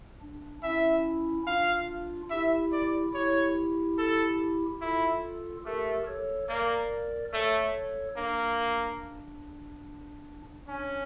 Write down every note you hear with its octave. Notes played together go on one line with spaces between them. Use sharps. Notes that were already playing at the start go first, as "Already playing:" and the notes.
D4
C#4 E4 E5
D4 F4 F5
E4 G4 E5
D5
E4 G4 C#5
A4
E4 F4 A4
A3 G4 A#4
A4 C#5
A#3 A#4 D5
A3 A4 C#5
A#3 D4
C#4 D4